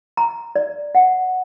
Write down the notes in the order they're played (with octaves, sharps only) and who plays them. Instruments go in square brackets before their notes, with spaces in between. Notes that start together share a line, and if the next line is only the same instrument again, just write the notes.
[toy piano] A#5
D5
F#5